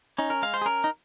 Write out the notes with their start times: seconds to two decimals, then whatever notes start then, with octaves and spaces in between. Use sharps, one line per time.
0.18 C#4 D#4
0.30 A#4
0.42 G#3 F5
0.54 C5
0.62 G#4
0.65 C#4 A#4
0.84 D#4